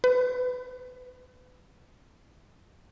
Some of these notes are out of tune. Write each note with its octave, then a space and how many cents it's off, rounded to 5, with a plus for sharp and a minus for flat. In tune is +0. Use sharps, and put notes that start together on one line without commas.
B4 +30